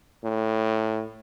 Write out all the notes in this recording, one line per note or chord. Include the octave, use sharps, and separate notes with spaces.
A2